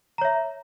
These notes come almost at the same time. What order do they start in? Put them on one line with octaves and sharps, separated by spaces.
A#5 C#5 E5